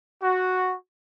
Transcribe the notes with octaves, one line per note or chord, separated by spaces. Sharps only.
F#4